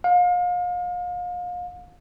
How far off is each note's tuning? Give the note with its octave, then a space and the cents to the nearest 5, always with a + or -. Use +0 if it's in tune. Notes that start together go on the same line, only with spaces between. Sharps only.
F5 +35